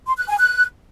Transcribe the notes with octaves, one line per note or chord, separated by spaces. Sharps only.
C6
F#6
G#5
F#6